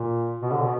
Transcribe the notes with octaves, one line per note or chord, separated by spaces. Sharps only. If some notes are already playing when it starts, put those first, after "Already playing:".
Already playing: A#2
B2
D3
B2